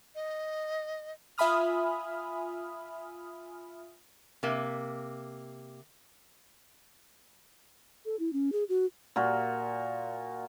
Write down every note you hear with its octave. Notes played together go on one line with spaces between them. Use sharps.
D#5
F4 E5 G#5 B5 D#6 F6
C3 A#3
A4
E4
C#4
G#4
F#4
A#2 F#4 A#4